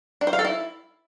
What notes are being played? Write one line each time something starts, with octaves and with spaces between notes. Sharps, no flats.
D4
C5
F5
A4
E4